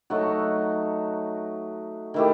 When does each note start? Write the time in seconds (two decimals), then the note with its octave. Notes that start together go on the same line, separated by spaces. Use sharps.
0.10 F#3 A3 D#4 F#4
2.14 D#3 A3 E4 G4